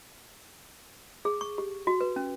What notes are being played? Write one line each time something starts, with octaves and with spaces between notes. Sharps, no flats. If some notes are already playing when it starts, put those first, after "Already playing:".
G#4
C#6
G4
F#4
B4
C#4